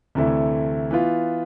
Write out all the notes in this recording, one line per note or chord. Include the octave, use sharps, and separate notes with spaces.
D2 C3 E3 A3 E4
E3 B3 F4